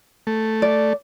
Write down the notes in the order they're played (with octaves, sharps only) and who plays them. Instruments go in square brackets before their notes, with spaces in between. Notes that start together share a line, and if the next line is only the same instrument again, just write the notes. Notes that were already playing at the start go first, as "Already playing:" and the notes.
[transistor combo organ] A3
[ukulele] D5